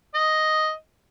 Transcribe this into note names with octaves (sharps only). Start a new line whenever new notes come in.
D#5